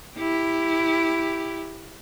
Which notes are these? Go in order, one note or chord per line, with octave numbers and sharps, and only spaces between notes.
E4 G4